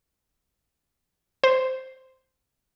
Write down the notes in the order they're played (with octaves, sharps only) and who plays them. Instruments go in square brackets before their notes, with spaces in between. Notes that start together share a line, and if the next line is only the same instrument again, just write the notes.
[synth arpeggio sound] C5